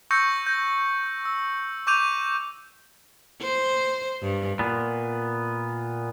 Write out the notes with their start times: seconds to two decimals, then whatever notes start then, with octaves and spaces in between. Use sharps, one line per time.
0.11 C#6 E6 G6 A#6 C#7
0.47 G6 A#6
1.25 E6
1.87 C#6 D6 G6 D#7 F7
3.41 C5
4.22 G2
4.59 A#2 B3